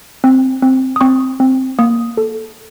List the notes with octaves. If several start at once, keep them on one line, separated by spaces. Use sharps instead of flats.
C4
C4
D#6
C4 C#6
C4
A#3 D#6
A4